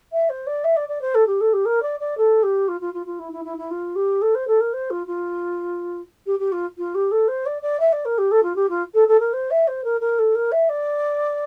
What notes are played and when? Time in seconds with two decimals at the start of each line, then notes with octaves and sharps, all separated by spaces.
0.12 E5
0.29 C5
0.47 D5
0.64 E5
0.76 D5
0.88 D5
1.01 C5
1.15 A4
1.27 G4
1.41 A4
1.53 G4
1.65 A#4
1.82 D5
2.00 D5
2.17 A4
2.43 G4
2.68 F4
2.81 F4
2.94 F4
3.06 F4
3.19 E4
3.33 E4
3.44 E4
3.58 E4
3.71 F4
3.95 G4
4.22 A4
4.35 C5
4.47 A4
4.60 A#4
4.73 C5
4.90 F4
5.07 F4
6.26 G4
6.39 G4
6.52 F4
6.78 F4
6.95 G4
7.11 A4
7.28 C5
7.46 D5
7.62 D5
7.80 E5
7.92 D5
8.05 A#4
8.18 G4
8.31 A4
8.43 F4
8.56 G4
8.69 F4
8.94 A4
9.08 A4
9.20 A#4
9.33 C5
9.51 E5
9.67 C5
9.84 A#4
10.01 A#4
10.19 A4
10.35 A#4
10.52 E5
10.69 D5